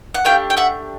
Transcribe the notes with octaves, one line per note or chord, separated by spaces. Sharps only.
F#5
A3 D4 G4 F5 G5
G5
E5 F#5